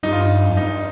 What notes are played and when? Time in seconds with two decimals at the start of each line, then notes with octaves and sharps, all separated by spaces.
0.03 G2 D#4
0.12 F4
0.21 D#4
0.49 F2
0.57 G2 D#4